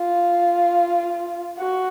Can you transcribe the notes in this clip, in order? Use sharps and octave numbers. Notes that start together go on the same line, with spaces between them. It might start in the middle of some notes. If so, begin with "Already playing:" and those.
Already playing: F4
F#4